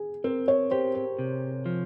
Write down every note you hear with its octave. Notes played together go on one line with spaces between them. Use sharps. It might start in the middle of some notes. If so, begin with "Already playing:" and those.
Already playing: G#4
C4 A#4
C#5
G4 C5
C5
C3
F3